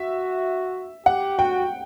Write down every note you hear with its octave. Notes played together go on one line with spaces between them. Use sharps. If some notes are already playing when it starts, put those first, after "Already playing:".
Already playing: F#4 E5
G4 F#5
F#4 G5